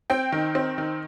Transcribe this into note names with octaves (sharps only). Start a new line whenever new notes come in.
C4 G5
D#3
C4
D#3